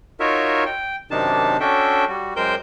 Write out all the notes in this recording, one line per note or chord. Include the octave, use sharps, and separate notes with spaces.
D#4 F4 F#4 A#4 C#5 E5
G5
F#2 C3 D#3 D4 D#4 A5
C#4 D4 F#4 A4 E5 G5
G3 F#4
F#2 G#3 A#4 C5 G5 G6